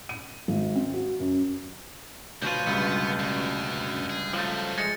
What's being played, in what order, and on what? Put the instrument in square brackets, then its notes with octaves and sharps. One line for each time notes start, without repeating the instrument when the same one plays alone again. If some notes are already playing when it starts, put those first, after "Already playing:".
[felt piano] D#7
G#1
C4
F#4
F#2
[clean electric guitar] D2 B2 F4 [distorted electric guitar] F#3 [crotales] G6 D#7
[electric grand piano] C#2 G2 [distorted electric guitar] B3
[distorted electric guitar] F#2
G#4
[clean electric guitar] F3 A3 [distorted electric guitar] F#3 D#4
[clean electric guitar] G#3 [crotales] A6 C#7